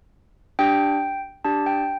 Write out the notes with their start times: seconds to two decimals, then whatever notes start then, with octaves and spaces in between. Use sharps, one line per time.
0.59 D4 G4 G5
1.45 D4 G4 A5
1.66 G5